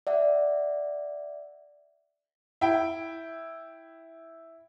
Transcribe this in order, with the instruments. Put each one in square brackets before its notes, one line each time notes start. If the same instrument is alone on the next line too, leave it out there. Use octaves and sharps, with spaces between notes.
[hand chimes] D5 E5 F#5
[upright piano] E4 G5